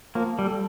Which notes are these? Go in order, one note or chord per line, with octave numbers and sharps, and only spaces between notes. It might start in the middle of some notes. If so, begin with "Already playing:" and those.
F3 A#3
G3
A4